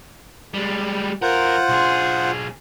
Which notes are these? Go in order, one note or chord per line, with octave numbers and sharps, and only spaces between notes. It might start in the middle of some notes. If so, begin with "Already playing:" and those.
G3 G#3
F2 F4 A#4 C5 F#5
B1 G#4